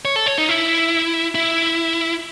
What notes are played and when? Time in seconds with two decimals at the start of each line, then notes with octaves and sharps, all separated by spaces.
0.05 C#5
0.16 A4
0.26 C#5
0.38 D#4
0.49 E4
1.35 E4